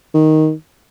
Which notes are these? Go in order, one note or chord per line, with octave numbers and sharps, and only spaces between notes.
D#3